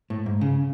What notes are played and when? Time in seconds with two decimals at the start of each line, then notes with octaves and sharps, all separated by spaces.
0.10 A2
0.26 G#2
0.41 C#3